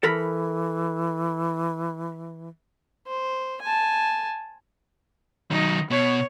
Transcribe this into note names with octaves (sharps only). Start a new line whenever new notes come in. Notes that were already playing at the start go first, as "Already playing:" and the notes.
E3 A4 A#4 B5
C5
G#5 A5
D#3 F#3 D#4
B2 C#5